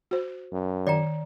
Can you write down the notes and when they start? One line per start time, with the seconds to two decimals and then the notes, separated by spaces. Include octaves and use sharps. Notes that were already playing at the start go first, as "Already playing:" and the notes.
0.11 F#4 C5
0.52 F#2
0.87 D#3 D5 G5 A#5